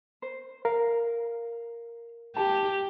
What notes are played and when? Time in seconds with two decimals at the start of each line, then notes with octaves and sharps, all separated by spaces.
0.22 C5
0.65 A#4 F5
2.37 G4 A5